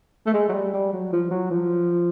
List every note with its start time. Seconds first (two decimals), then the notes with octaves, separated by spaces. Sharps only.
0.27 A3
0.33 G#3
0.49 F#3
0.53 G3
0.73 G3
0.93 F#3
1.12 F3
1.31 F#3
1.51 F3